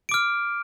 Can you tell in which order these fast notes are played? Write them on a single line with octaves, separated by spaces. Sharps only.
D7 D6 F6